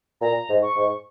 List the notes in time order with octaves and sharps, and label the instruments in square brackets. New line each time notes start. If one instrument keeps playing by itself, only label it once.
[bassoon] A#2 [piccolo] A#5
[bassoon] G#2
[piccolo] C#6
[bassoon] G#2